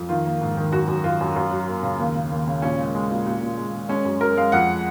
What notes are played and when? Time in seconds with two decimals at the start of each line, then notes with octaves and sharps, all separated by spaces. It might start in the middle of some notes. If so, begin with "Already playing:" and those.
Already playing: F2
0.09 D#3 F4
0.25 A#3
0.41 G#2
0.57 D#3
0.72 F#2 F#4
0.88 F#2
1.04 F#2 F4
1.21 F#2
1.36 F#2
1.51 F#3
1.67 A#3
1.83 C#3
1.99 D#2
2.15 C#3
2.31 D#2
2.47 C#3
2.62 A#2 C#4
2.79 G#3
2.95 G#3
3.10 A#2
3.26 A#2
3.42 A#2
3.57 G#3
3.73 G#3
3.89 G#3 C#4
4.05 F#2
4.21 F#2 A#4
4.37 G#3 F5
4.52 F2 F#5